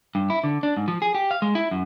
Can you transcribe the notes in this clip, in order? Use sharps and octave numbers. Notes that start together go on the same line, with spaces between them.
G2
E4
D3
D4
G#2
F3
G#4
G4
F5
G#3
E4
F#2